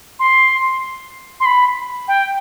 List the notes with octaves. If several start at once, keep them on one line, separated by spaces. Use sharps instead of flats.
C6
C6
B5
G5